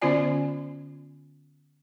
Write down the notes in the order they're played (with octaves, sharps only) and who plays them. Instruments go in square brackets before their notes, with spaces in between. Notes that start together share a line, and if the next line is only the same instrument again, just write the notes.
[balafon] D3 B3 C#4 F4 D5 G#5